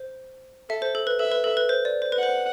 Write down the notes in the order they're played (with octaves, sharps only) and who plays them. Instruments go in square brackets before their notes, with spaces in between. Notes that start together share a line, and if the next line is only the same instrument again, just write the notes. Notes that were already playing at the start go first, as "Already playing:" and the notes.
Already playing: [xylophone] C5
[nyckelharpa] A4 [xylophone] E5
[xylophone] C5
A4
B4
[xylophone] A4 [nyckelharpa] E5
[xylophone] B4
A4
B4
C5
D5
C5
B4
[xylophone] C5 [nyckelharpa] F#5